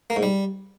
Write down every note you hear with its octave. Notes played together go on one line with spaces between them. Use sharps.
A#3
G#2
G3